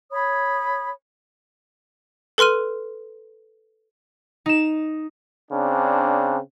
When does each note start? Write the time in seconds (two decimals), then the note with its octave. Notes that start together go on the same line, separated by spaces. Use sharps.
0.11 C#5 B5 D#6
2.38 A4 B4 C6 F6 D#7
4.46 D#4 E7
5.51 C#3 C4 D4